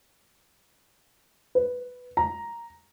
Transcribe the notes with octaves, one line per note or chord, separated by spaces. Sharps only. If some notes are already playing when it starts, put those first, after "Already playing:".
B4
A#5